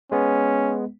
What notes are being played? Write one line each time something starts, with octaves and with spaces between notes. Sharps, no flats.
G#3 B3 C#4